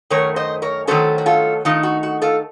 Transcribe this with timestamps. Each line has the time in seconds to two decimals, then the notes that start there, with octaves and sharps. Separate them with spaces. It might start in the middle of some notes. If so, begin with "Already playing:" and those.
0.10 F#2 D#3 A3 A#4 C#5
0.36 C5 D#5
0.62 A#4 C#5
0.87 D#3 F#3 A3 C#4 A4 C5
1.18 F#4
1.26 F4 A4
1.65 D#3 A3 D#4 F4
1.83 F#4
2.03 F#4
2.22 F4 A4